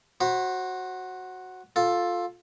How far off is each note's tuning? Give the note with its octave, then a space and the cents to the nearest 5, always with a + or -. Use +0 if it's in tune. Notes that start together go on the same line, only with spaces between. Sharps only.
F#4 +0 C5 +35 B5 +0
F4 +10 A4 +0